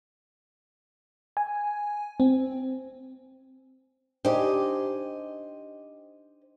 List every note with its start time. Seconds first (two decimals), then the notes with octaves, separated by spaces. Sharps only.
1.37 G#5
2.20 C4
4.25 D4 D#4 G4 G#4 C5 D#5